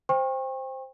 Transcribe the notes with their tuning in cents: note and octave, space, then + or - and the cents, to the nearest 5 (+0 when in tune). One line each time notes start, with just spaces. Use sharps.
C5 +0 G5 +30 C#6 -35